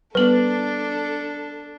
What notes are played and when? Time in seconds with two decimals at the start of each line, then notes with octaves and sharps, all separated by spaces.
0.15 G3 B3 D4 A4 B4 F#7